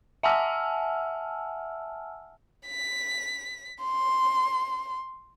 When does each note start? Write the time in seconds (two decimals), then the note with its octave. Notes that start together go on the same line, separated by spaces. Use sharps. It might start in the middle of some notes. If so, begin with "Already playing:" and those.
0.23 E5 F#5 G#5 A5 E6 F6
2.67 B6
3.82 C6